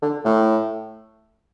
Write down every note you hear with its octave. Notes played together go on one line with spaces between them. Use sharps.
D3
A2